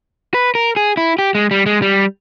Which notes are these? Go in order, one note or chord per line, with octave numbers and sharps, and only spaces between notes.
B4
A#4
G#4
E4
G4
G#3
G3
G#3
G3